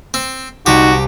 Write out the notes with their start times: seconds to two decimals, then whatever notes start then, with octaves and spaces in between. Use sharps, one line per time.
0.14 C4
0.66 C2 D#4 F#4 G4 D6